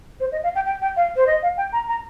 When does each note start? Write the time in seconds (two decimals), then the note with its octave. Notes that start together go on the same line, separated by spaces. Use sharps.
0.20 C5
0.32 D#5
0.43 F5
0.55 G5
0.66 G5
0.81 G5
0.96 F5
1.16 C5
1.27 D#5
1.43 F5
1.57 G5
1.73 A#5
1.88 A#5